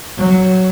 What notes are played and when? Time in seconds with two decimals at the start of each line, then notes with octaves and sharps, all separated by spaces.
0.17 F#3